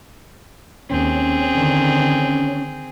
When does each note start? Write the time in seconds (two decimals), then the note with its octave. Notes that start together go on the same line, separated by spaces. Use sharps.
0.90 D#2 C4 C#4 G#4
1.53 D3 D#3